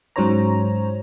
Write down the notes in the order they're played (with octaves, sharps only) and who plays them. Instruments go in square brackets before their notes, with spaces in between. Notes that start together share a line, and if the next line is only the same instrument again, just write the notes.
[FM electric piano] G#2 F#3 C#4 C5 C#5 A#5